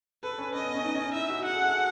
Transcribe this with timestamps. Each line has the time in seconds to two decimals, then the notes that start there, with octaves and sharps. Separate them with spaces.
0.23 A4 B4
0.38 C#4
0.54 C#4 D#5
0.64 B3
0.75 C#4
0.84 D#4
0.95 C#4
1.05 D#4
1.14 E4 E5
1.30 F#4
1.45 G#4 F#5
1.54 A4
1.64 G#4
1.74 F#4